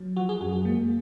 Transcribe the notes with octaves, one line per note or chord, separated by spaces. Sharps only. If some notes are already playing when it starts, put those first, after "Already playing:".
Already playing: F#3
F3 F#4
G#4
F#2 F#4
G#4
G#3 A#3